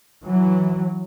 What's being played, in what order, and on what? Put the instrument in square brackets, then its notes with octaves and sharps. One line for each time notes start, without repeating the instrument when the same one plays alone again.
[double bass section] E3 F#3